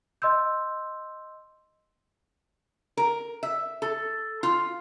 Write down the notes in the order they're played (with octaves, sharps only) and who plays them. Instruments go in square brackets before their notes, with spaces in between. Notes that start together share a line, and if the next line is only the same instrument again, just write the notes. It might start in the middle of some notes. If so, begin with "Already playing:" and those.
[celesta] D#5 C6 E6 G6
[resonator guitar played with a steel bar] A#4
E5
A4
F4